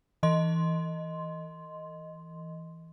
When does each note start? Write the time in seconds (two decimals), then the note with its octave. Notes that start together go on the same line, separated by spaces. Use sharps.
0.23 E3 D#5 C6